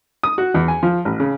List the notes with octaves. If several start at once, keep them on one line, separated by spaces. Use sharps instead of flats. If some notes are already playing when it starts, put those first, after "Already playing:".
D#6
F#4
E2
G#5
F3
A1
C#3